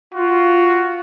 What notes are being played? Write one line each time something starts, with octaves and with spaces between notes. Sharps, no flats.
F4 F#4